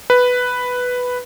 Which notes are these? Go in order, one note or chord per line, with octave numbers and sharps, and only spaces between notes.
B4